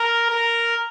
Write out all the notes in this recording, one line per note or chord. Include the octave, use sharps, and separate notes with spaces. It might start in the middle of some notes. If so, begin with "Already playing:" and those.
Already playing: A#4
A#4